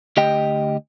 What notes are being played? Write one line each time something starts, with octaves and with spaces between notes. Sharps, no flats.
D2 G4 D#5 G5